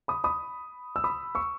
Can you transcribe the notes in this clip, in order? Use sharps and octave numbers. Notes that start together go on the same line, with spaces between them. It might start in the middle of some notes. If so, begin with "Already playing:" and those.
B5 D#6
B5 D#6
E6
B5 D#6
C#6 E6